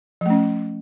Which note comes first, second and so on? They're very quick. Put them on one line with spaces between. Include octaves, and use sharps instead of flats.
F3 A3 C#4